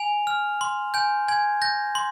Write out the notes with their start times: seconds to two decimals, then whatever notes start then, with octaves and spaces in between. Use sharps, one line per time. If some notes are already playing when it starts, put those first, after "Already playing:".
Already playing: G#5 F7
0.27 F6
0.61 C6
0.94 G#5 G6
1.28 G#5 G#6
1.62 G6 A#6
1.95 C6